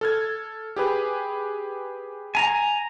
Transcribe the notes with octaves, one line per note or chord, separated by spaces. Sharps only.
A4 F6 G#6
G4 G#4 B4
G#5 A#5